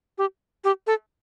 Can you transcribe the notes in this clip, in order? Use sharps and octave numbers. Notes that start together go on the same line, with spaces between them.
G4
G4
A4